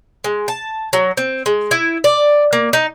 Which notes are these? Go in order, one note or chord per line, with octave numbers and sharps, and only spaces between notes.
G#3
A5
F#3
C4
G#3
E4
D5
A#3
D#4